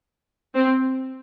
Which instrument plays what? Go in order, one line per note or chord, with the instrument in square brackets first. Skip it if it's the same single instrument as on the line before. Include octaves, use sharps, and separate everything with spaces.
[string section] C4